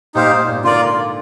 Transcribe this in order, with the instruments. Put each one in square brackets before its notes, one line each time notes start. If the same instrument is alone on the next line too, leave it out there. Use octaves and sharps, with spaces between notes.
[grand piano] A#2 [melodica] D#4 G4 C5 F5
[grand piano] G#2
A#2
[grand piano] D3 [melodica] F4 A#4 D5